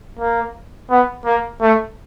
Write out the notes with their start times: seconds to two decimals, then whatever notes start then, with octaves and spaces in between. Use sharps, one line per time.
0.19 A#3
0.90 B3
1.25 A#3
1.61 A3